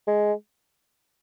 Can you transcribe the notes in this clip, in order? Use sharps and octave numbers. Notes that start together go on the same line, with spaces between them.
G#3